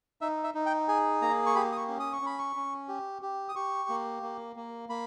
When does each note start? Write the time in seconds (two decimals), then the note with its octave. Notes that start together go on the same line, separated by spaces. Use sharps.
0.21 D#4 E5
0.44 E5
0.54 D#4
0.66 G5
0.88 G#4 G#5
1.22 A#3 A#5
1.46 C#6
1.55 G4 B5
1.72 D#6
1.77 C#6
1.88 C#4
2.00 D#6
2.13 C#6
2.22 C#4 B5
2.39 C#6
2.56 C#4
2.88 G4
3.22 G4
3.49 D#6
3.56 G4 C#6
3.89 A#3
4.22 A#3
4.56 A#3
4.89 A#3 B5